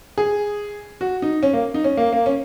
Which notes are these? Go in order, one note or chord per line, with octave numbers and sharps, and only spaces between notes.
G#4
F#4
D#4
C#4
A#3
D#4
C#4
A#3
A#3
C#4